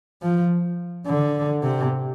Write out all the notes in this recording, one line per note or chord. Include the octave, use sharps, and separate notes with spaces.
F3
D3
C3